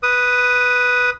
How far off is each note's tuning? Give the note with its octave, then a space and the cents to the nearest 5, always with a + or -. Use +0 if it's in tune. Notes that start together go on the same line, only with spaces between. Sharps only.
B4 +0 D#6 +0